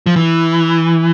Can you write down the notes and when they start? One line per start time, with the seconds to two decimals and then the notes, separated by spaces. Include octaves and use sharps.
0.06 F3
0.16 E3